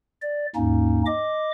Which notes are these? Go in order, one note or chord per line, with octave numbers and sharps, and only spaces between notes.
D5
D#2 G#2 A#3 C#4 D#4
D#5 D6